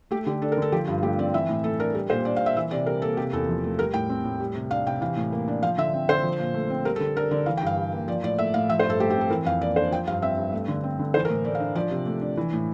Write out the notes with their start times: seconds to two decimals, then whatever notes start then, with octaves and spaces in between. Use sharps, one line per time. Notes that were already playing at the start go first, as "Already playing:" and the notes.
0.11 A3 G4
0.26 D3 G4
0.42 D4 A4
0.52 A#4
0.57 D3 A4
0.72 F3 G4
0.88 G2 F4
1.02 A3 G4
1.18 C4 D5
1.34 E3 E5
1.49 A2
1.64 A3 A4
1.79 D4 A#4
1.94 G3 A#4
2.10 A#2 C5
2.25 D4 D5
2.36 F5
2.41 A#2
2.46 E5
2.56 E3 E5
2.71 C3 D5
2.86 G3 A#4
3.02 A#3 A4
3.17 C3 G4
3.33 E2 A4
3.49 F3
3.64 A3
3.78 G3 A#4
3.94 A2 G5
4.10 C4
4.24 A2
4.40 G3
4.55 C3
4.71 D4 F5
4.86 C3 G5
5.01 E3 F5
5.16 A2
5.32 A#3
5.48 D4
5.63 F3 F5
5.78 D3 E5
5.94 C4
6.09 D3 C5
6.23 F3
6.39 A#2
6.54 A3
6.70 C4
6.85 G3 A#4
6.96 A4
7.00 D3
7.16 D4 A#4
7.31 D3 D5
7.46 E3 F5
7.57 G5
7.62 G2 F5
7.77 G3
7.92 A#3
8.08 F3 D5
8.23 A2 D5
8.39 A3 E5
8.54 A2 F5
8.69 F3 E5
8.79 C5
8.84 G2
8.90 A4
8.99 A3 G4
9.10 G4
9.15 C4
9.21 A4
9.30 E3 A#4
9.45 F2 F5
9.61 A#3 D5
9.76 D4 C5
9.91 F3 G5
10.07 G2 F5
10.22 C4 E5
10.37 G2
10.53 A3
10.68 D3
10.83 C4
10.99 D3
11.14 E3 C5
11.25 A#4
11.30 A2
11.44 A3 D5
11.55 F5
11.60 D4
11.75 F3 D5
11.90 C3
12.06 A3
12.21 D4
12.37 E3
12.53 A2